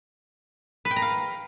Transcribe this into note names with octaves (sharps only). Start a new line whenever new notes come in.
B4
G5
A#5
F5